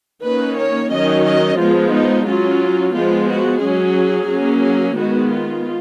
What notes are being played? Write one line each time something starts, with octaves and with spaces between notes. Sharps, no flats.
D#3 A#3 C#4 B4
C#5
D#3 F#3 C#4 D#5
D#5
F3 G#3 B3 F4
D#4
F#3 C#4 F4
F3 G#3 B3 F4
F#4
F#3 C#4 G#4
F#3 A#3 C#4
G#4
D#3 G#3 B3 F#4
F4